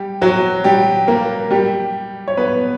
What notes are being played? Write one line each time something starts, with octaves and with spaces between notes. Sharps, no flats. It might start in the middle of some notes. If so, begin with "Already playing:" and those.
Already playing: G3 G4
F#3 F#4
G3 G4
A#3 A#4
G3 G4
C#5
B3 B4